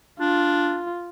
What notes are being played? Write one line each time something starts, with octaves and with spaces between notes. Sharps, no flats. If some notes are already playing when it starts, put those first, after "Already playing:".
D4 F4